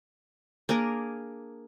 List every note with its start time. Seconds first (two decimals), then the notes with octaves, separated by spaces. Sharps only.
0.69 A#3 D4 G#4 A#4